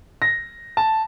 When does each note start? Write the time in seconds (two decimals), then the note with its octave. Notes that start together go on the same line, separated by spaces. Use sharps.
0.22 A#6
0.77 A5